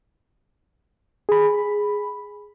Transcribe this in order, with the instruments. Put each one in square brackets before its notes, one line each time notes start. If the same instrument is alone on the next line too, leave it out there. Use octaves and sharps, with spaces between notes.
[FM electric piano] G#4 B5